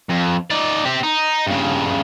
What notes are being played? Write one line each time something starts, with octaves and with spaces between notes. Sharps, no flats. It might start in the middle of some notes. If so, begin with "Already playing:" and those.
F2
D#4 D5
C4 G4
D#4
G2 C#3